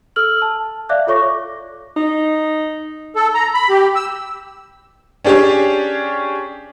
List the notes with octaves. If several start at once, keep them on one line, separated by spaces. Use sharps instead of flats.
A4 E6 F6 F#7
A5
D5 E5 F5 D6 F#6
F4 A4 C#5 C#6 D6 A#6
D#4
A4
A#5
B5
G4
E6
C#4 D4 G4 G#4 C#5